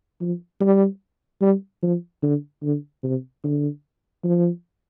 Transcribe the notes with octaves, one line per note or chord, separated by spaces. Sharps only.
F3
G3
G3
F3
D3
D3
C3
D3
F3